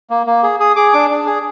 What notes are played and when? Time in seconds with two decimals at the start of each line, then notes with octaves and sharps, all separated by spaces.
0.10 A#3
0.27 A#3
0.43 G#4
0.60 G#4 D#6
0.76 G#4 D6
0.93 D4 D6
1.10 D4
1.26 G#4